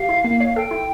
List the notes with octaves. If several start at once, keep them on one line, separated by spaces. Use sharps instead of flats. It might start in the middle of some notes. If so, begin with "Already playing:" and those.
Already playing: G4 F5
E4
A#3
C#5
A4 G5
E4